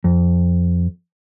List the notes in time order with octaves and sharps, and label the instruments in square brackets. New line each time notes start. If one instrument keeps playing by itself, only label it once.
[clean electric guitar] F2